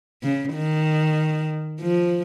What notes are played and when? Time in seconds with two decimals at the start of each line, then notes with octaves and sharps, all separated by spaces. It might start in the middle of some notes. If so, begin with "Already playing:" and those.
0.23 C#3
0.55 D#3
1.81 F3